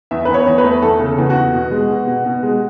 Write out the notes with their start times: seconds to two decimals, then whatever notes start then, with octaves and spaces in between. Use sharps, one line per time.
0.11 E2 E5
0.25 E2 B4
0.34 C#5
0.47 E2
0.58 B4
0.64 A3
0.82 E2 A4
1.00 C#3
1.06 A4
1.18 E2
1.30 F#4
1.36 E2
1.54 B2
1.71 G#3
1.89 B2
2.08 B2
2.26 B2
2.43 G#3